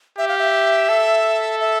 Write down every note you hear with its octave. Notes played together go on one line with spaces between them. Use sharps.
G4 E5
F5
E5
A4
E5